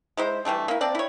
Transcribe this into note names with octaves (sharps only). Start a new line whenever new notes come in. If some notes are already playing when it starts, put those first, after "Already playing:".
G#3 E4 C5
E3 G3 A3 D4
A#3 E4
C4 D4 D5
E4 C#5